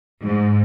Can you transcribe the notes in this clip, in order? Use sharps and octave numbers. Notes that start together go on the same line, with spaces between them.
G#2